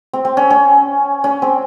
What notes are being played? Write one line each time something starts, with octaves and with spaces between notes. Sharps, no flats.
C4
C4
C#4
C#4
C#4
C4